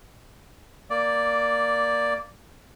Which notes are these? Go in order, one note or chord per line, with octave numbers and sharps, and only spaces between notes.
A#3 D5